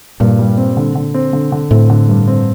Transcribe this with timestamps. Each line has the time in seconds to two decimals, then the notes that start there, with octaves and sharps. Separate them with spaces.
0.20 G2 A#2
0.39 G3
0.58 C4
0.77 D3
0.95 D3
1.14 C4
1.33 D3
1.52 D3
1.71 A2 C4
1.90 D3
2.09 G2
2.28 C4